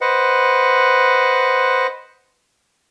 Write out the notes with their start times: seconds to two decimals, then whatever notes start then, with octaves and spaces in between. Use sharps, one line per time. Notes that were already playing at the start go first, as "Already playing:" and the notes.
0.01 B4 C5 D#5 F#5